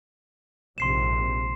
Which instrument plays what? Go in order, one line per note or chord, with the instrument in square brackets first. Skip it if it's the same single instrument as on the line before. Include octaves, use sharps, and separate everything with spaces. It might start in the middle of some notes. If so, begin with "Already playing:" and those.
[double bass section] A#1 G#2 C3 [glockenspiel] C6 C7 E7